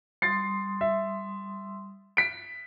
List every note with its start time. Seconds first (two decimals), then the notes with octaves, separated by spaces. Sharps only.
0.22 G3 C6 D#6 A6 C7
0.81 E5
2.17 B6 D7